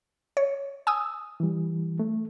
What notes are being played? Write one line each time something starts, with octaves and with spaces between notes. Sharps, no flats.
C#5
G#5 D#6 E6
E3 G3
A3